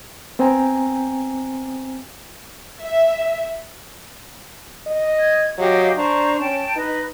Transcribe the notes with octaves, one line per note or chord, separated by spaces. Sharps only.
B3 C4 C5 G5 G#5 A#5
E5
D#5
G#6
F#3 G4 D#5 F5
D4 C5 A#5 C#6
C#4 G5 A5
D#4 B4 D#5